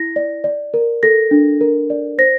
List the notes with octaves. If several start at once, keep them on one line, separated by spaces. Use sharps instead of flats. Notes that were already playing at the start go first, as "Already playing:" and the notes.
Already playing: E4 A#6
D5
D5
A#4
A4 A#6
D4
A#4
D5
C5 A#6